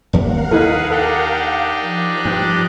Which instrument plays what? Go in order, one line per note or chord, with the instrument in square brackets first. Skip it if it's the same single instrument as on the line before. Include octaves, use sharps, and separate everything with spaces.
[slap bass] F1 D#2 G3 [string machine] A#4 F5 F#5
[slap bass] D#2 [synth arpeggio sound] D#4 E4 A4 [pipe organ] G#4 B4
[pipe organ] D4 D#4 G4 [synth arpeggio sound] A4
[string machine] F3 F#6
[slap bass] G2 [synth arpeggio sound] G5